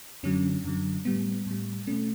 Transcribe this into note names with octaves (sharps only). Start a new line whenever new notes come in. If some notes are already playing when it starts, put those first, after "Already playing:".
F#2 D3 F#3 C#4
F#2 D3 F#3
A2 G3 B3
A2 G3
B2 A3 C#4